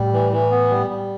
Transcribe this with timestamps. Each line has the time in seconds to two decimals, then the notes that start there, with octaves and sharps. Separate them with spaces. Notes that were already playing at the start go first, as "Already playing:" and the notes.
Already playing: A2 G3
0.13 E3
0.32 E3
0.51 B3
0.71 G3
0.90 G3